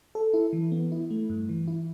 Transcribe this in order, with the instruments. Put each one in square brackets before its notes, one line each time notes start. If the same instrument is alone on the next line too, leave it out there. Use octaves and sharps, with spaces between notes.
[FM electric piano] A4
E4
E3
B3
E4
A3
G2
E3
E4